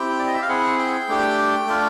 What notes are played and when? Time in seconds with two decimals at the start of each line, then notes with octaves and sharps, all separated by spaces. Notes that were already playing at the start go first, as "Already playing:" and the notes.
Already playing: C4 E4 G4 G5
0.19 D5
0.27 D#5
0.34 E5
0.42 F5
0.49 C4 E4 G#4 F#5
0.79 G5
1.09 A3 D4 G4
1.67 A3 D4 F4